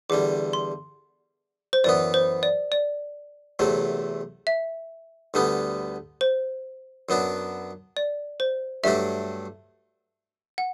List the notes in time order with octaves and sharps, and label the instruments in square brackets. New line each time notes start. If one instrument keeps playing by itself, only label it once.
[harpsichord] E2 D3 G3 [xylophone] D6
[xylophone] C6
C5
[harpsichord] F#2 E3 B3 [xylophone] D5
[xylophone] C5
D5
D5
[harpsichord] E2 C3 F#3 A3
[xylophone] E5
[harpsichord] D2 D3 G3 B3
[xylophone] C5
[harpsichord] F#2 F#3 B3 D4
[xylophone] D5
C5
[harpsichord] G2 F#3 A3 D4 [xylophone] E5
[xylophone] F#5